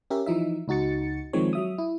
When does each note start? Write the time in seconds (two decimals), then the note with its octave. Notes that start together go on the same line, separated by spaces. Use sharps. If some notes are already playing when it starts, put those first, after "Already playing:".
0.10 C#4 G4 A#4 E5
0.26 E3 F3 D#4 E5
0.68 C#2 D#4 F#4 A6 C#7
1.33 D#3 F3 G#3 C4 C#5
1.53 F#3 E5 D#6
1.78 E4